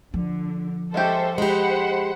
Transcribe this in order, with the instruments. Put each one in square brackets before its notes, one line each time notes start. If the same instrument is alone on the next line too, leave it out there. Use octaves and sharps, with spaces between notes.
[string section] D3 [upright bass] F3
[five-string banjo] G#3 C#4 G4 [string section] A4 C5 E5
[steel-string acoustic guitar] G#3 G4 [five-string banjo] D#4 [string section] C5 F#5 B5